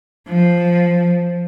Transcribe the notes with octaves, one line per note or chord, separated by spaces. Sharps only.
F3